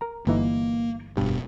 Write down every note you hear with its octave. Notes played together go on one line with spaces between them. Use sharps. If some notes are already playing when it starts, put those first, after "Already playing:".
A#4 A#5
G1 E3 A#3 D#4
F1 G2 B2